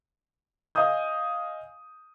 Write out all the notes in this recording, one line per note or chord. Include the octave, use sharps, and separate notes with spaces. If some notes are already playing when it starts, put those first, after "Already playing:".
D#5 F5 G#5 D#6 G6